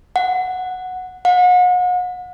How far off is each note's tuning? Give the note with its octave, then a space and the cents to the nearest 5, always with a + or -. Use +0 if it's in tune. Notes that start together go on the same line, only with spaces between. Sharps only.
F#5 -5
F#5 -40